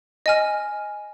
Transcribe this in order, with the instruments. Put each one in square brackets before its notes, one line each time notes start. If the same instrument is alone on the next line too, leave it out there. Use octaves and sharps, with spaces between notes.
[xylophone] D#5 G#5 F6